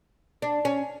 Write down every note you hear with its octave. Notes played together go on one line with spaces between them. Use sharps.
D4
C#4